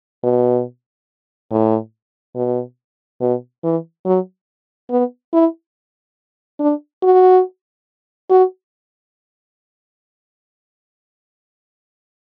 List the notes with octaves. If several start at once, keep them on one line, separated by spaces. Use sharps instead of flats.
B2
A2
B2
B2
E3
F#3
B3
E4
D4
F#4
F#4